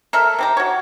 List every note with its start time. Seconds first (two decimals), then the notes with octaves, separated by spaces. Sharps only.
0.13 A4 A#4 E5
0.39 C3 G4 A#5
0.57 F#4 C#5